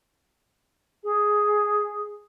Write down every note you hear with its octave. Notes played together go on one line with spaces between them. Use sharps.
G#4